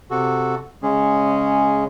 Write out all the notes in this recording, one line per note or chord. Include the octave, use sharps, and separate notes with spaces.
C3 F#4 A4
C#3 G#3 C#4 G#4